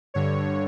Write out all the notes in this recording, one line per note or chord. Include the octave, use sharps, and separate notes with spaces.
G2 D3 C#5